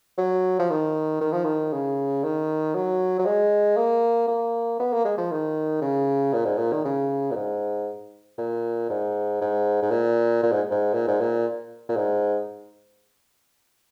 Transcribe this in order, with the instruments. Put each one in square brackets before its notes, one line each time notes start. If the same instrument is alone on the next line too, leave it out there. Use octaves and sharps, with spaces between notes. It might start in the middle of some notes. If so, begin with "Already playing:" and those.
[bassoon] F#3
F3
D#3
D#3
F3
D#3
C#3
D#3
F#3
F#3
G#3
A#3
A#3
B3
A#3
G#3
F3
D#3
C#3
A#2
G#2
A#2
D#3
C#3
A#2
G#2
A#2
G#2
G#2
G#2
A#2
A#2
G#2
G#2
A#2
G#2
A#2
A#2
G#2